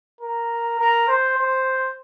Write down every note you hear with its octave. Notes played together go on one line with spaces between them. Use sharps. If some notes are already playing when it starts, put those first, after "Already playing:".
A#4
A#4
C5
C5